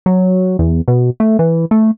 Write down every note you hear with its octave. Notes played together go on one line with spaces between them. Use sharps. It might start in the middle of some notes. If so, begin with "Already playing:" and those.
F#3
E2
B2
A3
E3
A3